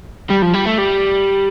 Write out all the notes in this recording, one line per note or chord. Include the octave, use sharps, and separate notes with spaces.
G3
F3
G3
A3
G3